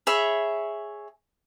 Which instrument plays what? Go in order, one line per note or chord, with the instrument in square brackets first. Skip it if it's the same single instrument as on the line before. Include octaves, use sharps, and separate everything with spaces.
[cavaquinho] G#4 C#5 E5 B5